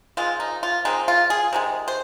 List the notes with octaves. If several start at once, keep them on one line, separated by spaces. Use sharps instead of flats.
D#3 G#3 C4 F4
D#4
F4
D#3 G#3 C4 D#4
F4
G#4
C3 D#3 G#3
C5